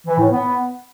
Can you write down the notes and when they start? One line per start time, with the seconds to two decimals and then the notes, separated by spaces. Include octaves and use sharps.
0.07 E3
0.19 A2
0.31 B3